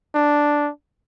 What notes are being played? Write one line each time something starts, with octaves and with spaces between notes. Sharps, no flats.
D4